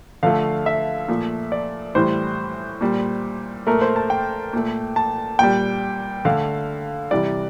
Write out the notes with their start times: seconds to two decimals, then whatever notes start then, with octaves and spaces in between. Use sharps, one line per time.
0.23 D3 F3 A3 F5
0.66 E5
1.08 A#2 F3 A3
1.52 D5
1.95 A2 E3 G3 C5
2.81 A#2 G3
3.67 A#2 A3 A#4
3.81 C5
3.96 A5
4.10 G5
4.53 A#2 A3
4.96 A5
5.39 A#2 G3 G5
6.25 D3 A3 F5
7.11 C3 E3 G3 D5